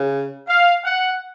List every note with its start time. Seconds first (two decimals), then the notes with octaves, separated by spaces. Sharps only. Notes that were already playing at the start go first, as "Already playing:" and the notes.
Already playing: C#3
0.48 F5
0.84 F#5